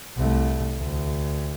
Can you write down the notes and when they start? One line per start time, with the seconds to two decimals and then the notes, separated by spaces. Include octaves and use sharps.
0.17 C2 A3
0.78 D2